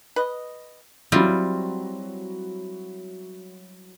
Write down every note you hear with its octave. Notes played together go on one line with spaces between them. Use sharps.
B4 D#5
F#3 G3 C4 E4 F4